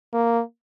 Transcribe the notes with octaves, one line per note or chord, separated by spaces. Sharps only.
A#3